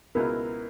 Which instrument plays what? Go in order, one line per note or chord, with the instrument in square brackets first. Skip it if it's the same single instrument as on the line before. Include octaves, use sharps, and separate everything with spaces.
[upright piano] C#2 B2 G#3 B3 E4 [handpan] A#4